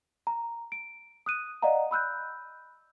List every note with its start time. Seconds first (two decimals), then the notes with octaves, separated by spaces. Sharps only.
0.27 A#5
0.72 D7
1.26 D#6 F#6 D#7
1.62 D5 D#5 F5 F#5 A#5
1.91 B5 E6 F#6 G6